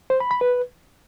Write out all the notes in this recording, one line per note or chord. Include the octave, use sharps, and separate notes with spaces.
C5
B5
B5
B4